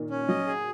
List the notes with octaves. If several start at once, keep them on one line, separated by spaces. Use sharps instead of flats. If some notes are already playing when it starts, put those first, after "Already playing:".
Already playing: A#2 D#3
C#4
F#3 D#5
G#4